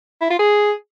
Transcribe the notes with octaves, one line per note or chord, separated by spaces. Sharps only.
E4
F4
G#4